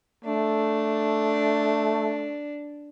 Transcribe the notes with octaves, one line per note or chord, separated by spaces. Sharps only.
A3 D4